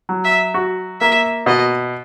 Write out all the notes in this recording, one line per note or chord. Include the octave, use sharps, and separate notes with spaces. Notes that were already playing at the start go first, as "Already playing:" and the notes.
F#3
E5
F#4
A#3 E5
B2 D#5